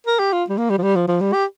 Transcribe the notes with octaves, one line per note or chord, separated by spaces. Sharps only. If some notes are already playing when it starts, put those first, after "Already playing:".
A#4
G4
F4
G3
A#3
G3
F3
G3
F3
F3
G3
G4